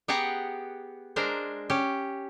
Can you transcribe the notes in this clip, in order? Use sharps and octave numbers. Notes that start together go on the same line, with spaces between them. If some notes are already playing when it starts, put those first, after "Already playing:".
B3 G4 G#4 F#5 G5 A#5
G#3 D4 A#4 C5
C#4 G4